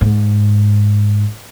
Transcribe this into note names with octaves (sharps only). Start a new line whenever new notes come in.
G#2